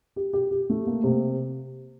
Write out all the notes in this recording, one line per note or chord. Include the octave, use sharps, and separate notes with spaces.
G4
G4
G4
A3
A#3
C3